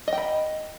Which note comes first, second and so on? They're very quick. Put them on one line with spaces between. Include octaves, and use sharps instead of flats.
D#5 G5 B5